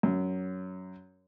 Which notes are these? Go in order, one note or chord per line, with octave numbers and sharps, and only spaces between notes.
F#2